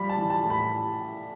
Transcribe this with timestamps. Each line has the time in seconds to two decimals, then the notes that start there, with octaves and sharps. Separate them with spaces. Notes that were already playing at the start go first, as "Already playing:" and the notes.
Already playing: F3 G3 B5
0.09 A5
0.17 E3
0.30 A5
0.44 A2
0.50 B5